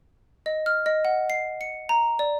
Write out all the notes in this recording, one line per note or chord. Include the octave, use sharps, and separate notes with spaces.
D#5
F6
D#5
F#5
C7
C#7
A#5
D5